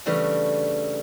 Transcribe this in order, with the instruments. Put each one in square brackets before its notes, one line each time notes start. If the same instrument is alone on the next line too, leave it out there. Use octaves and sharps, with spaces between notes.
[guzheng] C#3 E3 G3 A3 D4